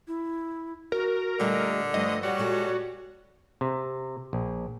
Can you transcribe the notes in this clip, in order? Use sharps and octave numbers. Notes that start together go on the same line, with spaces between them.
E4
F#4 A#4
A#2 D3 G3 A3 D#5
G2 F3 A3 D#5
A#2 G3 F#4 C#5
A#2 G#3 A4
C3
A#1